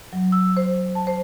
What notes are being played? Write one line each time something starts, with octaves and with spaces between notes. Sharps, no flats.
F#3
E6
C5
A5
C5